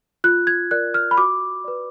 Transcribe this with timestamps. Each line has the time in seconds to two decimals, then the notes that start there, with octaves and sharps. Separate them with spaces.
0.24 F4 F#6
0.47 G#6
0.71 A#4 D5 F#6
0.94 F6
1.11 B5
1.17 F#4 D6
1.64 B4 D5